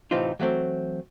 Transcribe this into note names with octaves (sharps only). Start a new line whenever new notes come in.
A2 C3 E3 C4 D#4 F4
E3 F#3 A3 C4